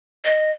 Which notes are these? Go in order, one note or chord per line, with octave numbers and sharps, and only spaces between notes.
D#5